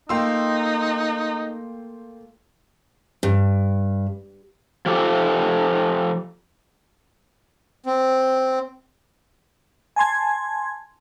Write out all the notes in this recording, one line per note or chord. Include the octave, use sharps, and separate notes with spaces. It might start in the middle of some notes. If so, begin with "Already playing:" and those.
A3 A#3 D#4 F4 G5 C6 E6
G2
F3 G4 A4
C4
G#5 A5 C6 G#6